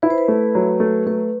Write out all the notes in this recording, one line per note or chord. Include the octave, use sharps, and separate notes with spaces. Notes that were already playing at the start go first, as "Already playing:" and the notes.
E4 B4
C5
B4
A3
F#3
A3
A3 B4